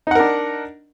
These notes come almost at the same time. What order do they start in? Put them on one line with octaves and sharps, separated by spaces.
D#4 F#5 A#4 D4